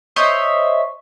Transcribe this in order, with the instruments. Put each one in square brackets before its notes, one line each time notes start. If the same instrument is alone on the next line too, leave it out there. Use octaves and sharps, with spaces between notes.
[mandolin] C5 C#5 D#5 E5